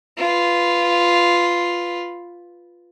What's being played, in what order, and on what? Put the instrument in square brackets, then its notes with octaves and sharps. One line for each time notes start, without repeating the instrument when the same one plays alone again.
[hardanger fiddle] F4 B4